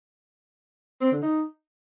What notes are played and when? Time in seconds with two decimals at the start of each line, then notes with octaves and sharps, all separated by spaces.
1.01 C4
1.12 D3
1.22 D#4